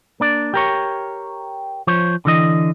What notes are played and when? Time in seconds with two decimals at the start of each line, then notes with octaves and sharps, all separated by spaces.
0.20 A#3 D4 D5
0.54 G4 A#4 C#5
1.87 F3 C5 C#5
2.25 D3 E3 D#5